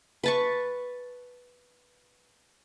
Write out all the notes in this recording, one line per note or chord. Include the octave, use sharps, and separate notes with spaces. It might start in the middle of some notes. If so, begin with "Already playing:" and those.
B4 A5 C#6